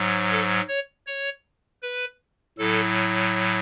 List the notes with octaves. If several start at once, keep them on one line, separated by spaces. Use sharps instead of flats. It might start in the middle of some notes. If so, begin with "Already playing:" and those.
Already playing: G#2 F#3
A4
C#5
C#5
B4
A2 F#3 A4